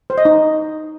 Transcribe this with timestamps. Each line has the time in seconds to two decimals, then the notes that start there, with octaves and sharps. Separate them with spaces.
0.10 C5
0.18 D#5
0.25 D#4